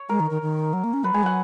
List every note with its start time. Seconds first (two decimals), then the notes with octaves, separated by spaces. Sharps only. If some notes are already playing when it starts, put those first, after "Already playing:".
Already playing: C#5
0.09 G#3 A#4
0.20 D#3
0.30 D#3
0.42 D#3
0.73 F#3
0.84 A#3
0.93 C#4
1.04 F#3 B4
1.13 G#3 G#5
1.23 F#3 F#5